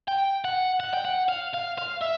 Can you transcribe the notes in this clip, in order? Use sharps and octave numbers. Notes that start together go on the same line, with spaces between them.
G5
F#5
F#5
G5
F#5
F5
F5
F5
E5